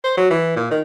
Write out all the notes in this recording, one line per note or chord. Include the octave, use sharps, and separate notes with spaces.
C5
F#3
E3
A#2
D#3